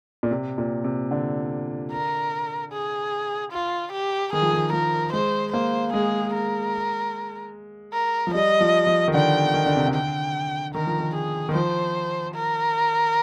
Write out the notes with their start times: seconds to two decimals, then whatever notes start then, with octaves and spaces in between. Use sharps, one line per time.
0.23 A#2
0.31 C3
0.58 A#2
0.84 C3
1.11 D3
1.92 A#4
2.72 G#4
3.52 F4
3.92 G4
4.33 D#3 G#4
4.42 F3
4.53 D#3
4.73 F3 A#4
5.13 G#3 C5
5.52 A#3 C5
5.93 G#3 G#4
6.34 A#4
7.93 A#4
8.27 F3
8.34 G3 D#5
8.61 F3
8.87 F3
9.08 D#3
9.14 D3 G5
9.54 D#3
9.66 D3
9.76 C3
9.88 D3
9.94 G5
10.75 D#3 A#4
10.87 F3
10.98 D#3
11.15 G#4
11.49 D#3
11.55 F3 C5
12.35 A#4